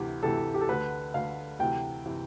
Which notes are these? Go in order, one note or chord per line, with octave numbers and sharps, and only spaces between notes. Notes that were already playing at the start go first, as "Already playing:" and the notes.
Already playing: D2 C3 E3 G4
D2 C3 E3 A4
G4
A4
D2 D3 B4
D2 D3 F5
D2 C3 E3 G5
C3 E3